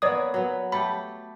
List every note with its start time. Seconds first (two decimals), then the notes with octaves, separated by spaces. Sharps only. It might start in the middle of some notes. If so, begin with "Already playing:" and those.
0.02 A#3 B3 C#5 D5 D#6
0.34 F#3 B3
0.72 A3 G4 B5